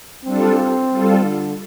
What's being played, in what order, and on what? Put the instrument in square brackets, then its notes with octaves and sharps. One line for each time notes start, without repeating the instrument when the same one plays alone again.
[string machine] G3 D4 F4 A4 [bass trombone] C4
[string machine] G3 F4 A4
[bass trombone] D3